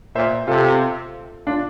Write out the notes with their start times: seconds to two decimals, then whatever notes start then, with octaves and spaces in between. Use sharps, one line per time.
0.15 A#2 C5 E5
0.48 C3 F4 A4
1.47 D4 F4